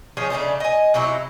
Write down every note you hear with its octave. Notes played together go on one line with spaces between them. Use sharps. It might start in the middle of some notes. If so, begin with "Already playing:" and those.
F3 D#4 G#4 C#5
C#3 A3 D4 D#4
D#5 G#5
C3 F#3 D#4 E4